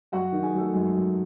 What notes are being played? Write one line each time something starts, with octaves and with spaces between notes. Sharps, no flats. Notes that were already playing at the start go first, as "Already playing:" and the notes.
F#2 F#4 F#5
D#3
G#4 G#5
F#3 A3 A4
F#2 G#3 G#4
F#3